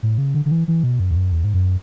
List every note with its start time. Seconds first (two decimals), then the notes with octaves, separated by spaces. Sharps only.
0.03 A2
0.18 C#3
0.35 D3
0.46 D3
0.51 E3
0.68 E3
0.84 B2
1.00 F#2
1.11 E2
1.16 F#2
1.32 E2
1.44 G#2
1.54 F#2